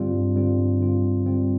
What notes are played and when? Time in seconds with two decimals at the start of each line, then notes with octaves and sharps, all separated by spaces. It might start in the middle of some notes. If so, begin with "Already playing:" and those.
Already playing: G2 D3 G3 C4 F4
0.13 G2
0.36 D3 G3 C4 F4
0.58 G2
0.81 D3 G3 C4 F4
1.03 G2
1.25 D3 G3 C4 F4